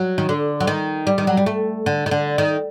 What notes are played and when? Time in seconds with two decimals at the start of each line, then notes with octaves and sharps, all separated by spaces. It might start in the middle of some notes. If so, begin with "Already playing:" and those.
Already playing: F#3
0.18 D#3
0.29 D3
0.60 F#3
0.67 D#3
1.07 G3
1.18 D#3
1.27 F#3
1.37 G3
1.46 A3
1.86 D3
2.06 D#3
2.11 D3
2.38 D#3